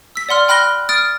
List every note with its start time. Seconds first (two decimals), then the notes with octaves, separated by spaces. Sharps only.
0.16 E6 B6
0.29 D5 F#5 C6 F6
0.48 G5 B5 F6 F#6 A#6 G7
0.89 D#6 F6 A6 D7